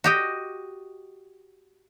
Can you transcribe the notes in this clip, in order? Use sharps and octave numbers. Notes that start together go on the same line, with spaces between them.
F#4 G4 D#5